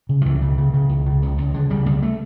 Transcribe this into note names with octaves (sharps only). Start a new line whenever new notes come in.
C#3
F3
C#2 E3
C#3
C#3
C#3
C#2
C#3
C#2
C#2
C#2 D3
C#3 G3
C#2 G3
A3